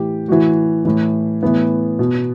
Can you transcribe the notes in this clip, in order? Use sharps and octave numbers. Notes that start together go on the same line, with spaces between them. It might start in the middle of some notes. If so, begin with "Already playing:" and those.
Already playing: A2 E3 G4
A2 E3 F#4
A2 E3 E4
A2 E3 B3
B2